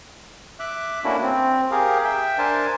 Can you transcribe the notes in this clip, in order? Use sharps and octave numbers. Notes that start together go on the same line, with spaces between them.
E5 D6 F#6
A3 A#3 C#4 D4 E4 F#4
C4
G4 G#4 A#4 F5
E5 G5
D4 A#4 C5 G#5 A5